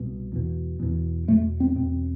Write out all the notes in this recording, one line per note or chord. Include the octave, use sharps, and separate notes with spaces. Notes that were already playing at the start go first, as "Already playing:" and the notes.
Already playing: C2 B2
E2 B2
E2 B2
E2 B2 A3
C4
E2 B2 C4